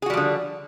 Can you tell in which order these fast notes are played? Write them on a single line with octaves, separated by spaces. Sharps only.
G#4 F#4 G3 F3 D3